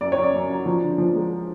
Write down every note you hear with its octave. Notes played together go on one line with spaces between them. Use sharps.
F#2 D5
C#5
F#2
D5
F#2
F#3
F3
D3
F3
G#3